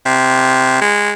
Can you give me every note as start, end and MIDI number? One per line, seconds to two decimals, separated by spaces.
0.06 0.79 48
0.81 1.13 56